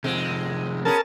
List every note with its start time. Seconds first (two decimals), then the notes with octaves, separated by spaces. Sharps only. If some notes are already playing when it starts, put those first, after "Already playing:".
0.04 C3 D#3 F3 G#3 C4
0.85 B3 C#4 G#4 A#4 A5